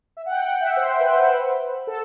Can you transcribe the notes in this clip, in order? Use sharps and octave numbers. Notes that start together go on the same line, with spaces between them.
E5
F#5
G5
F#5
E5
C5
B4
C5
A4